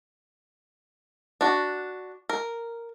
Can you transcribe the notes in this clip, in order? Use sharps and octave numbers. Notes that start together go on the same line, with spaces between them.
D4 F#4
A#4